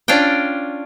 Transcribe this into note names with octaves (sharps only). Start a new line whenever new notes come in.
C#4 D4 F4 D5 G5